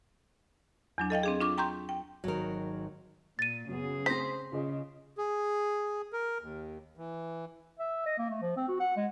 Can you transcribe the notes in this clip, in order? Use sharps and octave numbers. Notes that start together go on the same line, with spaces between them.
E2 F#3 D4
A4 D#5 F5 G5
C4 D4 G#4
D4 F4 C#6 D6
G5 A#5 C6 C#6 G6
G5
G#1 D#3 F#3 A#4
A#2 A6 D#7
F#2 C#3 B3 G#4
A3 C4 C5 A#6 B6
C#3 F4 G#4 D#5
G#4
A#4
D#2
E3
E5
D#5
A#3
A3
F3
C4
F#4
F#5
G#3